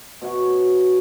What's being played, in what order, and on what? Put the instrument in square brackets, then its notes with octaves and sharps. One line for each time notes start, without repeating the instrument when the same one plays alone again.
[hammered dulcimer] B2 C#5 F#5